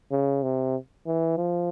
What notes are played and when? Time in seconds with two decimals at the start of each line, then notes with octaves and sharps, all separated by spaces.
0.11 C#3
0.43 C3
1.06 E3
1.37 F3